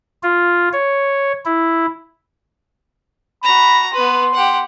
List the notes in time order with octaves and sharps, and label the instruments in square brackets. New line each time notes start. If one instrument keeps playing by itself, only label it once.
[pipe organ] F4
C#5
E4
[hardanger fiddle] F#4 A#5 [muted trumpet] B5
[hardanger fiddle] B3 B4 [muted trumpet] C6
[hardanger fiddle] G4 F#5